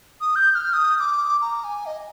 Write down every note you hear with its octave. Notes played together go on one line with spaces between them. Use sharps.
D#6
G6
G6
F6
D#6
D#6
D6
A#5
G#5
D#5